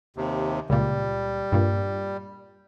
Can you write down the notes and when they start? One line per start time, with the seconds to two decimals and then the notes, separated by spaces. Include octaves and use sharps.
0.17 D#2 C3
0.70 C#2 A#2 G3
1.52 G2 A#2